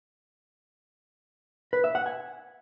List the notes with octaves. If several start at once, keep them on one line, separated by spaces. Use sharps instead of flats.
B4
E5
F#5
G#5